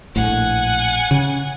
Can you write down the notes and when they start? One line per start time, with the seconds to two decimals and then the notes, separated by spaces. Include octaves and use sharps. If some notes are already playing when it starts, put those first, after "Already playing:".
0.16 A#1 A2 F#5 G#5
1.11 C#3